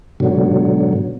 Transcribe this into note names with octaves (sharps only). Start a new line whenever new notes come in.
G#2 B2 D3 F#3